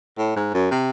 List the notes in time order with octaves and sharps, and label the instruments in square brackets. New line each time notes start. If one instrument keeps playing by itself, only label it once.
[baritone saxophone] A2
G#2
F#2
C3